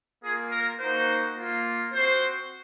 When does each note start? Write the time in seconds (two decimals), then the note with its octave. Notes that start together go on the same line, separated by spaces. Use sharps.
0.22 A#3 F4 G#4
0.51 A#4
0.79 A#3 D#4 F#4 C5
1.36 A#3 F4
1.92 C4 F#4 C5